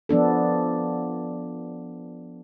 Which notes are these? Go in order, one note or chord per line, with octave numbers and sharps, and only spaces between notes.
F3 B3 D4 A4